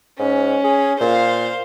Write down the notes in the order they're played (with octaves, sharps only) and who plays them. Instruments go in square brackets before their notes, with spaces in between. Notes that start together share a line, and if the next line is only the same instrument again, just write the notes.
[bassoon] G#2 [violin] C#4
[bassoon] G#4
[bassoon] A#2 [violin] C5 F5